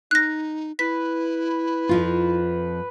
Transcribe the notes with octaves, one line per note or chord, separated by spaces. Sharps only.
D#4 F#6 A#6
E4 B4 B6
F2 F3 F4